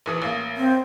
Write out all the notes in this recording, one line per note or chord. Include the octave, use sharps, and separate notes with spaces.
A#1 E3 D#6
A1 A#3
C4